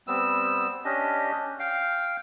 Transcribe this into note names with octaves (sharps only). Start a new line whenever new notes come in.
G3 B3 C4 E6
C#4 D4 G4 D#5
F5 G5